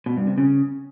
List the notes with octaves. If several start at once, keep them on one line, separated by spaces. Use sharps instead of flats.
B2
G2
C3
C#3